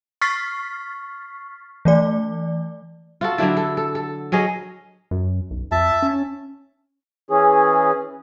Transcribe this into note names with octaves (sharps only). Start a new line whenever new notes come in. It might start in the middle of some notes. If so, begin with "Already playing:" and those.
C#6 F6 A6 B6 C7
E3 A3 D5
F4 F#4 A4
D3 F#3 D4 E4
A4
A4
A4
F#3 C#4 G#4 D#5
F#2
B1
F2 E5 A5
C#4
E3 C#4 G#4